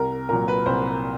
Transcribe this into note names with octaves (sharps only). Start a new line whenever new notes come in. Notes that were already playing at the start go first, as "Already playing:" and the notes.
Already playing: C2 A#4
A#2 F#3 A#4
B4
C2 C5